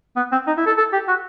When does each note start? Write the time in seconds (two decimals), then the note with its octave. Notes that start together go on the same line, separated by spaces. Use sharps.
0.16 B3
0.32 C4
0.47 D#4
0.57 E4
0.66 A4
0.78 A4
0.93 G4
1.08 F#4